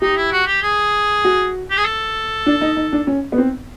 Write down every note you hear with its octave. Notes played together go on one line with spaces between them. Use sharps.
D#4 G4
E4
F#4
G4
G#4
F#4
G4
G#4
A4
D4
D#4
D#4
D4
C#4
B3
C4